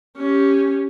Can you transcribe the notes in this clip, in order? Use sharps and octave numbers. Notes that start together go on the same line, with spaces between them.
C#4 G4